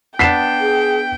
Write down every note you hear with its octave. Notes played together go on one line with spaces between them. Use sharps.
B3 D4 G5 B6 C7 E7
G#4